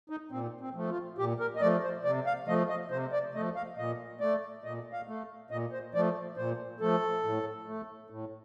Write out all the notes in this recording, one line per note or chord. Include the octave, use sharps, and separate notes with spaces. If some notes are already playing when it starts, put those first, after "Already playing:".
D#4
A#2 C4
C4
F3 A3
F4
A#2 G4
A#4
D#5
F3 A3 D5
C5
C3 D5
F5
F3 A3 D#5
D#5
C3 C5
D5
F3 A3 D#5
F5
A#2 D#5
A3 D5
A#2 D#5
F5
A3
A#2 D#5
C5
F3 A3 D5
A#2 C5
F3 A3 A4
A2
A3
A2